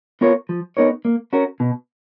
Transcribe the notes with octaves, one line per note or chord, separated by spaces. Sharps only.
B3 F4 A#4 C#5
F3
B3 D#4 A#4 C#5
A#3
C#4 F#4 A#4
B2